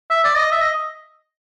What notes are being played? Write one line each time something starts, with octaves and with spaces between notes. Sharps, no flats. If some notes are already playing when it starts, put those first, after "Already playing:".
E5
D5
D#5
E5
D#5